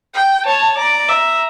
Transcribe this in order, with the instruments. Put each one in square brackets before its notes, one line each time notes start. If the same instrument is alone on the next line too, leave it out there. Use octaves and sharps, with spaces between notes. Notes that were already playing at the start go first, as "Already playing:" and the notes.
[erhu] G5
[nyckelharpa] C#5 [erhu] A5
[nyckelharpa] D5 [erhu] A#5
[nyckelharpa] E5 [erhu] A#5